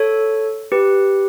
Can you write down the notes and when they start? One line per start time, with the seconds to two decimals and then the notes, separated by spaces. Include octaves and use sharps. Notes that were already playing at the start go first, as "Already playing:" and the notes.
Already playing: A4 C#5
0.72 G4 B4